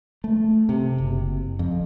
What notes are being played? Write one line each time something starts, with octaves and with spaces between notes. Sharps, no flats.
A3
C3
F#1
F2